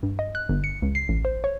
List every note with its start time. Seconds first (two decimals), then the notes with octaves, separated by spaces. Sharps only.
0.03 G2
0.19 D#5
0.35 F#6
0.49 G1
0.64 C#7
0.82 C#2
0.95 C7
1.09 A1
1.25 C5
1.44 C#5